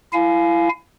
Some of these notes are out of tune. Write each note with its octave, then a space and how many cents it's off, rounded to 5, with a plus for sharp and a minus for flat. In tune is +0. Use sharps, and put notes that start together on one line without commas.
E4 +25 F5 -5 G#5 +25